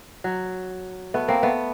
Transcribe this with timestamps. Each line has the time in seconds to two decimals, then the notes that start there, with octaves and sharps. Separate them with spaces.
0.24 F#3
1.14 A3 B3
1.28 A#3 C4
1.43 A3 B3